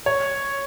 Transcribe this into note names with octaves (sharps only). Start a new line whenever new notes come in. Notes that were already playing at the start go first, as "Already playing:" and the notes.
C#5